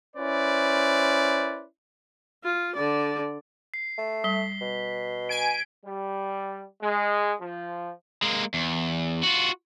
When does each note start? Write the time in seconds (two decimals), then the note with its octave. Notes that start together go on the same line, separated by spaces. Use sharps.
0.16 C#4 E4 B4 C5 D5
2.44 F4
2.76 D3 D5
3.74 C7
3.98 A3
4.24 G3 B6 G7
4.61 B2
5.29 G#5 D7
5.84 G3
6.82 G#3
7.40 F3
8.22 G#3 A#3
8.54 E2
9.23 F4 F#4